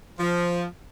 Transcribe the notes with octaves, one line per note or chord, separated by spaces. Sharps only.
F3